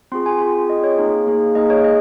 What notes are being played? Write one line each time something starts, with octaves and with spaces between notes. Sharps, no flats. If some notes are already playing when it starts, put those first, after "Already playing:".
C4 F4 G#4 C6
G#5
C4 F4 G#4
C4 F4 G#4 D#5
C#5
A#3 D#4 G#4
A#3 D#4 G#4
A#3 D#4 G#4 D#5
C#5
G#4 D#5